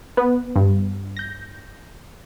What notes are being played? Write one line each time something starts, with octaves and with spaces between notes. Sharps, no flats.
B3 B4
G2
G6 A#6